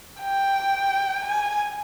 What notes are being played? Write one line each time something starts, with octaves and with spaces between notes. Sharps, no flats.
G5
G#5